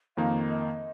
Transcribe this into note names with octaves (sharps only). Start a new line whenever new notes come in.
F2 D#3 A#3 D#4 F5
D#5